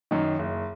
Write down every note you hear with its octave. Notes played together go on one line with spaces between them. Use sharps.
F#2 D#3
F#1